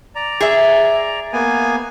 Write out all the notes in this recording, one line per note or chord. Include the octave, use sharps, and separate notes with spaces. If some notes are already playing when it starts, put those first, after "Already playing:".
D5 A#5
G#4 E5
A#3 B3 G#5